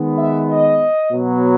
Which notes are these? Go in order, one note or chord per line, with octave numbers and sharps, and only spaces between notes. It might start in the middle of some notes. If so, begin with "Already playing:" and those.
Already playing: D#3 G#3 B3
E5
D#5
B2 F#3 B3